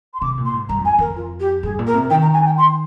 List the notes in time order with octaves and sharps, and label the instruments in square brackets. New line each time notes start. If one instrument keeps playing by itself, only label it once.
[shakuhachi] C6
[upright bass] C3 [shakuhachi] D6
[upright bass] A#2
[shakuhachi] C6
[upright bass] G#2
[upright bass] G2 [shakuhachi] A#5
[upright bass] F2
[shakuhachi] G#5
[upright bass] F2 [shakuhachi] A#4
[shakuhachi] F4
G4
[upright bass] G2 [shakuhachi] G#4
[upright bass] A#2
[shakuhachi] A#4
[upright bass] C3
[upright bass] D#3 [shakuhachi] G5
[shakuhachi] A#5
G#5
G5
C6